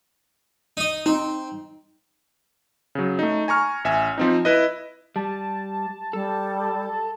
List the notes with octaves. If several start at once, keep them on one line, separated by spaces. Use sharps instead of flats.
D#4 D#5
C4 D#4
C#3 F#3
A3 D#4
G#5 A#5 C#6 F6
A1 E5 G#5
F3 C4 D#4
E4 B4 D#5
G3 A5
G3 A4